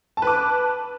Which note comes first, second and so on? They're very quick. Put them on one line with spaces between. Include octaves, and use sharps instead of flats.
A5 B4 D6